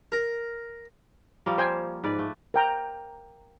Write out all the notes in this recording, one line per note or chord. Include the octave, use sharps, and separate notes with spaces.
A#4
F3 G3 A#3
C5 G5 G#5
G#2 B4 D5
A3
A#4 G5 A#5